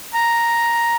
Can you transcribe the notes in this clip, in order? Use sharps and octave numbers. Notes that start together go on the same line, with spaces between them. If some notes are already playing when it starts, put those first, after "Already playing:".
A#5